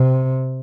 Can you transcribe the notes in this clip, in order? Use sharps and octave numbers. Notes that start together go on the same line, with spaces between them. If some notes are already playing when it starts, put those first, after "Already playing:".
Already playing: C3